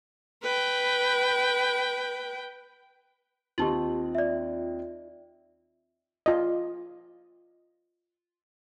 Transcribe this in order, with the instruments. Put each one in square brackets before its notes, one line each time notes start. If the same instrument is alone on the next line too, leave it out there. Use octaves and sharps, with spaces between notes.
[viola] B4 G5
[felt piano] D#2 C4 D#5 [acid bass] F4 [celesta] G4 A5 F#7
[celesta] D5 E5
[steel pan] F4 D5 D#5